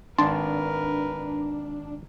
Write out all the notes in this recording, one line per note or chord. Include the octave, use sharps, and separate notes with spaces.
G#1 D4 A#4 B4 A5 C6